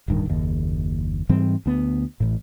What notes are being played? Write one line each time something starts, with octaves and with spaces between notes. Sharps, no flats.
D1 G2 D#3
F#1 D#2
G#2 E3 G3 C4
D2 B3
A1 A2